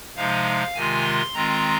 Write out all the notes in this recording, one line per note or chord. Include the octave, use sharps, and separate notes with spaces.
C3 F3 G#3 D#4 F5
C3 D#3 G#3 F4 G#5
C6
D#3 G#3 C4 F4 A#5